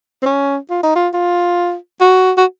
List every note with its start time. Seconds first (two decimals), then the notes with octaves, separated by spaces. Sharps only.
0.22 C4
0.26 C#4
0.70 F4
0.83 D#4
0.96 F4
1.14 F4
2.01 F#4
2.37 F#4